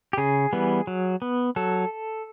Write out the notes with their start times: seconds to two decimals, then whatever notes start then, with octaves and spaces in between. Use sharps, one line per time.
0.13 G4
0.18 C#3 G#4
0.53 E3 G3 B3
0.87 F#3
1.22 B3
1.56 F#3 A4